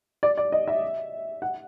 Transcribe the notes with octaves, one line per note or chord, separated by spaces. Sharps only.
D5
D5
D#5
E5
F#5